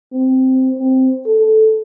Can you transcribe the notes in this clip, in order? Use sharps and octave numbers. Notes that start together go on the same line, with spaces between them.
C4
C4
A4